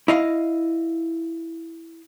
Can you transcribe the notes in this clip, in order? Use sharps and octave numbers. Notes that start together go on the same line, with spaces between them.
E4 D#5 F5